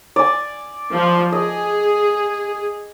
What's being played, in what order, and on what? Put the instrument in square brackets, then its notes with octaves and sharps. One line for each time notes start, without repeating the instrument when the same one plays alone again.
[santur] D5 G#5
[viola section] F3
[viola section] G#4 [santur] D#5